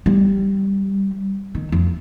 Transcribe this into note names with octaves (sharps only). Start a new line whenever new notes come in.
G3
D#3
F2